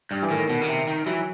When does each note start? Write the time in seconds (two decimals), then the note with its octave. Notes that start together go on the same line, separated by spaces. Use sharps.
0.11 G2
0.22 E3
0.30 A2 D#3
0.49 B2
0.61 C#3
0.68 C3
0.87 D#3
1.06 E3 F#3